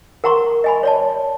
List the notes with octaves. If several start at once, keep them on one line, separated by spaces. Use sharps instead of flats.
A#4 F#5 A#5 C6 C#6
D#5 G#5 B5
C#5 D5 A5